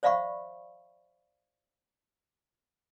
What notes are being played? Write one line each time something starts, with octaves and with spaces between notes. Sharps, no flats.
C5 D5 E5 F5 B5 C#6